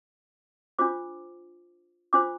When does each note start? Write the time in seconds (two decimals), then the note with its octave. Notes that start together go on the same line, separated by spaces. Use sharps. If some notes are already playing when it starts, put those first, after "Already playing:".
0.79 D4 F4 C5 D6
2.13 D4 F4 C5 D6